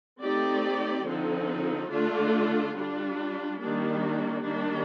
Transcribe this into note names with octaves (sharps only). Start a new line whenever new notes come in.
A3 C4 D#4 G4 D5
D3 F3 C4 D#4 A4
D3 A3 D4 F4
G3 D4 F4
D#3 G3 A#3 D4
D#3 G3 A#3 D4